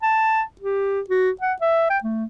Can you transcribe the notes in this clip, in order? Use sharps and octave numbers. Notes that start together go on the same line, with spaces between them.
A5
G4
F#4
F#5
E5
G5
A3